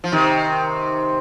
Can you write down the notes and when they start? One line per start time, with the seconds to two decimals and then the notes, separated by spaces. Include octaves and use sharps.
0.04 F3
0.12 C3 D#3